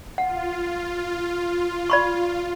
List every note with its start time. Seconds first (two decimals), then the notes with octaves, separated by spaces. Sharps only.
0.18 F4 F#5
1.90 D5 B5 C#6